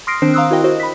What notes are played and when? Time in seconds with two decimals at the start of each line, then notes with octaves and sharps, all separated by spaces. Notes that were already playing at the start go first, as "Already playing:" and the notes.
0.07 C6 D#6 F6 A#6 C7 D7
0.22 D#3 C4 D4 C5 C7
0.34 F5 A#5 C6 D#6 E6 F#6
0.51 E4 F#4 A#4 D#5 G5
0.64 F#4 C5 D#5
0.80 B5 B6